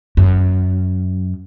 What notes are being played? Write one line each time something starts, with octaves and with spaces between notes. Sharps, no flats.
F#2